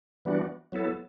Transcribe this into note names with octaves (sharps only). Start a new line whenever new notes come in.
E3 G3 B3 D4 F#4
F#3 B3 E4 A4